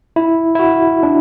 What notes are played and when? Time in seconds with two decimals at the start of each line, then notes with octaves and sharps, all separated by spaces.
0.16 E4
0.55 E4
0.59 F#4
1.03 D4